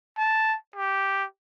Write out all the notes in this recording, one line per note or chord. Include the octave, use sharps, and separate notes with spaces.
A5
G4